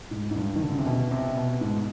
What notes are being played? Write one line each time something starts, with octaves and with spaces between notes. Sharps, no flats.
G#2
G#2
G2
D#3
D3
C#3
C3
B2
C3
B2
G#2